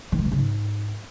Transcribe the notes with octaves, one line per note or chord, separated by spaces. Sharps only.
D#3
G#3
B2
C#3
G#2